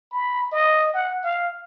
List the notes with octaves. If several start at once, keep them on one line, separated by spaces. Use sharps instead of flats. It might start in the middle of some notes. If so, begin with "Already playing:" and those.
B5
D#5
F#5
F5